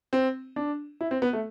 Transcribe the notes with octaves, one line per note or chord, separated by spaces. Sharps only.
C4
D4
E4
C4
B3
A3